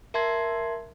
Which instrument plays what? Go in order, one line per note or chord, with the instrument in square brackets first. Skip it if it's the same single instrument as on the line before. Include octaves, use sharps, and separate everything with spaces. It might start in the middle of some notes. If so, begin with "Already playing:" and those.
[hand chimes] A#4 E5 A5 C6 G#6 C7